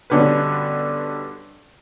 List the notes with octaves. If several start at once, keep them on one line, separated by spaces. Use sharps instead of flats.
G2 B2 D3 C#4 B4